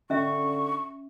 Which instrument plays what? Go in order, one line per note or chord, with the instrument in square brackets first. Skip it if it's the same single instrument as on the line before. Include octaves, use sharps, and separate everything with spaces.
[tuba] D3 [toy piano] C#4 E5 [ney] C#6